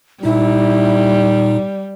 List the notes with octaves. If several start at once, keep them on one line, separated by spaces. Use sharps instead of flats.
A#2 G3 D#4 E4